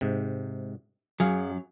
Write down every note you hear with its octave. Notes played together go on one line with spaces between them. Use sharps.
G#2 C3
F#2 F#3 G#4 F5